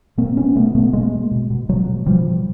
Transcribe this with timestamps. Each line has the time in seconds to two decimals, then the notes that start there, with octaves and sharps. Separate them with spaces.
0.18 B2 A#3 C4
0.36 B2 B3 C#4
0.56 B2 A3 B3
0.75 B2 A3 B3
0.93 B2 G#3 A#3
1.12 B2
1.31 B2
1.50 B2
1.69 B2 F#3 G#3
1.87 B2
2.06 B2 F3 G3
2.26 B2